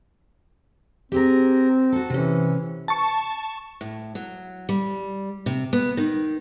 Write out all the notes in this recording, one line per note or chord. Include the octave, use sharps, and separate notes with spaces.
C4 G4 G#4 A#4
F#4 A4
C3 E3 C#4
A5 C#6
A2
F#3
G3
C3
B3
D#3